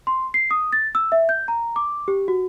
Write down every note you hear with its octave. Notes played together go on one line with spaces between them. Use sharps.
C6
C7
D#6
A6
E6
E5
G6
A#5
D6
G4
F#4